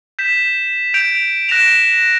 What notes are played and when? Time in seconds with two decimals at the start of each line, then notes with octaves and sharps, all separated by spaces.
0.19 G6 B6 E7
0.94 G6 D7 F7
1.49 F#6 A#6 D7 E7 F7